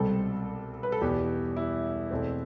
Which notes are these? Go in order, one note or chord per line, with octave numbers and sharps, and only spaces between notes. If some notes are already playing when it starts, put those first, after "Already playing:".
Already playing: C2 B2 G3 C4 A4
B4
A4
E2 B2 B3 G4
E4
E2 B2 A3 C4